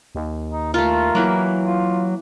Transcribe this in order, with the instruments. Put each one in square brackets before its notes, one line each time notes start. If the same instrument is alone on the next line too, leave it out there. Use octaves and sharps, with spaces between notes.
[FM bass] D#2
[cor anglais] D#4
[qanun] A3 F4 [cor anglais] A#4
[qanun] E3 A#3 [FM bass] F#3
[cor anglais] F4